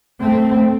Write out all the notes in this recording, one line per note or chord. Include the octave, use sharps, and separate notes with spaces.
A3 C4